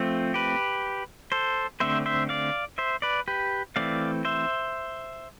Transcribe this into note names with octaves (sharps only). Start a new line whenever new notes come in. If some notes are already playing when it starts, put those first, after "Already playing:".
Already playing: F3 A3 C4
G4 B4
A4 C5
D3 A3 C4 C5 E5
C5 E5
D5 F5
C5 E5
B4 D5
G4 B4
E3 A3 C4 D5 F5
C5 E5